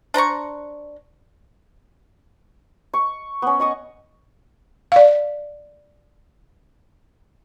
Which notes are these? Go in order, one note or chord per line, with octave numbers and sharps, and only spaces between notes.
D4 C5 A#5 C#6
C#6
B3 C#4
D#5 C#6 D#6
D5 F5